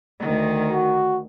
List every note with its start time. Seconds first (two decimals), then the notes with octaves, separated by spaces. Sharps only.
0.22 D2 D#3
0.72 F#4